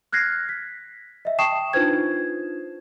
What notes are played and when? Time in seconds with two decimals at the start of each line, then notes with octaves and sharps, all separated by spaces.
0.12 F6 F#6 G#6 A#6 C7
0.49 B6
1.25 D#5 E5
1.38 G5 A5 C#6 D#6 C7 E7
1.73 D4 D#4 F4 B4 C5 G#6